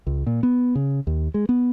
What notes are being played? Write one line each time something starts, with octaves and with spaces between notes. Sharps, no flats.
C#2
A#2
B3
C#3
D#2
G#3
B3